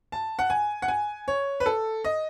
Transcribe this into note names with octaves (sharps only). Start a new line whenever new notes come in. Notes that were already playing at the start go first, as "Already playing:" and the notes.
A5
F#5
G#5
F#5
G#5
C#5
B4
A4
D#5